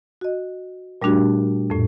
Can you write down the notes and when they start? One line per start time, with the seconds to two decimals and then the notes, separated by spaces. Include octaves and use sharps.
0.21 F#4 D#5
1.02 A#2 G3 A3 D4 F#4 G4
1.70 F2 A2